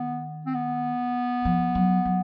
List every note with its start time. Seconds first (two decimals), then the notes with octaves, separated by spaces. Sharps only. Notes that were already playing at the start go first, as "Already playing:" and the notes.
Already playing: D#3 B3
0.46 C4
0.55 B3
1.45 F3
1.75 F#3
2.05 F#3